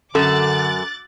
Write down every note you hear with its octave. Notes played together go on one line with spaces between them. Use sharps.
F#2 D3 A4 D6 F#6 A6